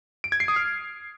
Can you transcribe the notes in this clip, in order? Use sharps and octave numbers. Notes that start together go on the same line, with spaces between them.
D7
G#6
C7
D#6
F6